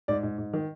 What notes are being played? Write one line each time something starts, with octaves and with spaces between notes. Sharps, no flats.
G#2 D5
G#2
G#2
D#3